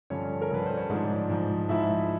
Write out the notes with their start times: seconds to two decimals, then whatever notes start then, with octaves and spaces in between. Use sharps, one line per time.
0.10 G2 D3 F3 C#4 C#5
0.42 A#4
0.51 G2 D3 F3 B4
0.66 C5
0.77 C#5
0.90 G#2 F3 D4 D5
1.29 G#2 F3
1.69 G#2 F3 E4 E5